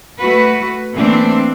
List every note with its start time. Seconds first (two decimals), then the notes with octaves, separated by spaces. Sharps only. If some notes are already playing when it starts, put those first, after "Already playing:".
0.18 A3 F#4 B4
0.94 E3 A3 A#3 C4 D4